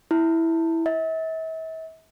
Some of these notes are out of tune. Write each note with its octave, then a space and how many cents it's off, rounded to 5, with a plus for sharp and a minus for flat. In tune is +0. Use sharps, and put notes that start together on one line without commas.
E4 -5
E5 -40